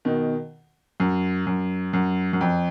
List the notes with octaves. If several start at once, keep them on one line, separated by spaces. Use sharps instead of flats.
B2 D#3
F#2
F#2
F#2
F#2
F2